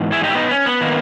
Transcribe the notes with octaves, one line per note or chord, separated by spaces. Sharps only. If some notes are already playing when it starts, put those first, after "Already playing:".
Already playing: G#2 E3 B3
E4 G#4
D#4 G4
E4
B3 D#4
C#4
B3
D#3 A#3